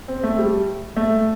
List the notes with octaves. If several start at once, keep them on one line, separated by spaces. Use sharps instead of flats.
C4
A3
G3
A3